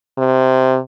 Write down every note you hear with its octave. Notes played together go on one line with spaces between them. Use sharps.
C3